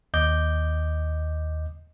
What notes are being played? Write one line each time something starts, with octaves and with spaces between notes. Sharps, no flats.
D#2 D#5 D6 G6